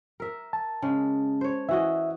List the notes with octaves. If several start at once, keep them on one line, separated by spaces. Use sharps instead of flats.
A#4 E5
A5
C#3 G#3
C5 C#5
E3 F#4 D#5 E5